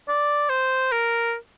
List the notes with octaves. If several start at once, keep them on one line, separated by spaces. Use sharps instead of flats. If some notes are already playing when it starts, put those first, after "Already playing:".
D5
C5
A#4